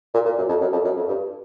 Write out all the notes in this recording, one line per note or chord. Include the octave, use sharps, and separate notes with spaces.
A#2
A#2
F#2
F2
F#2
F2
F#2
F2
G2